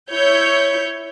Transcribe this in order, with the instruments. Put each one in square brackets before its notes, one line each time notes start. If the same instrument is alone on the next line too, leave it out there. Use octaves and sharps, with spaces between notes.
[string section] E4 C#5 G6